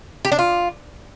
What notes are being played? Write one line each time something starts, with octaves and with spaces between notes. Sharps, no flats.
G4
D4
F4